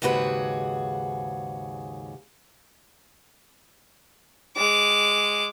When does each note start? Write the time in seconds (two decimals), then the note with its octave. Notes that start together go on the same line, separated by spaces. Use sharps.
0.02 D#2 G#2 C#3 F#4 G#4 B4
4.57 G#3 D6